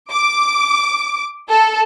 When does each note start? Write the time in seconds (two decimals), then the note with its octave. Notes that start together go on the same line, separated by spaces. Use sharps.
0.10 D6
1.49 A4